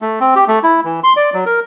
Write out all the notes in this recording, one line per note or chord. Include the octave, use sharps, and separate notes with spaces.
A3
C4
G4
A3
E4
E3
C6
D5
F#3
A#4